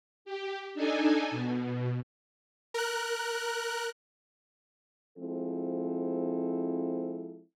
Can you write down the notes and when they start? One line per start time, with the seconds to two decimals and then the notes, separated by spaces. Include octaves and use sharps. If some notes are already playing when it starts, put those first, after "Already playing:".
0.25 G4
0.74 D4 D#4 A4 G#5
1.31 B2
2.74 A#4 F#6
5.18 F3 G#3 C4 E4 A4